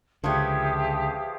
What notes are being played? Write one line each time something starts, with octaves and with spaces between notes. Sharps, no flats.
C#2 D3 F3 G4 G#4 B4 C#5 E5